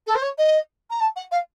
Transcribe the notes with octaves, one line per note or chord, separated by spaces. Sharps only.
A4
C5
C#5
D#5
A#5
A5
F#5
F5